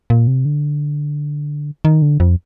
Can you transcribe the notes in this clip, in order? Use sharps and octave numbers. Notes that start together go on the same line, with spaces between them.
A#2
C3
D3
D#3
D3
F2